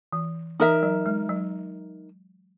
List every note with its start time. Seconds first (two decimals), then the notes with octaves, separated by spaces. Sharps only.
0.13 E3
0.60 E3 D#4 A#4 E5
0.83 F#3
1.06 G#3
1.29 F#3